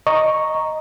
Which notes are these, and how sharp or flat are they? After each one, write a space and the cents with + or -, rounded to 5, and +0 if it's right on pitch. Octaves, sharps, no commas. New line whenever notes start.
D#5 +0 A#5 +0 C#6 +0